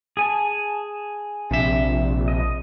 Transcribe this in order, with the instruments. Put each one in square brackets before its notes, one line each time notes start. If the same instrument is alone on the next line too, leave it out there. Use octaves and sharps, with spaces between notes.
[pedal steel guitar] G#4 G#5 A5
[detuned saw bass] A#1 [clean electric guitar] C3 E5
[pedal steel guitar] D#5